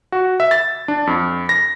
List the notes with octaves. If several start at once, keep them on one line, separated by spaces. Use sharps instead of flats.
F#4
E5
A6
D4
F2
A#6